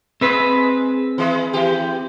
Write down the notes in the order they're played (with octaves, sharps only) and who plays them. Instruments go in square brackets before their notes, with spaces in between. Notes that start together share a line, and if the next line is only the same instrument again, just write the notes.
[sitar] G#3 [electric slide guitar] C4 B4
[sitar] E3 G#3
E3 G4